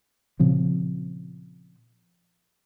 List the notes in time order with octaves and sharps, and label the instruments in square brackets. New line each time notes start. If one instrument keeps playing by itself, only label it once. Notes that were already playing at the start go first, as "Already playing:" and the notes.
[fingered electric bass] A#2 C#3 F3 C4